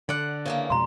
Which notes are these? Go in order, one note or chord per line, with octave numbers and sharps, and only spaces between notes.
D3 D5 F#5
C#3 E3 A#3
F2 B2 G#3 A#5 C6